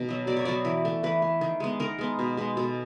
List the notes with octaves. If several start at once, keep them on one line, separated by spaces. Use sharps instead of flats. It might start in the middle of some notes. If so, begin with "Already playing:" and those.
Already playing: B2 D#3
F#3 B3
B2 D5
C#5
F#3 B3 D5
E3
A3
E3 B4
A3
D#3
G#3 B3
D#3 A#4
G#3 B3
B2
G#3 B3
B2 A4